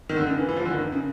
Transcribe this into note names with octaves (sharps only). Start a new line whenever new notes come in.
D#3
D3
C#3
E3
E3
F3
D3
D#3
C#3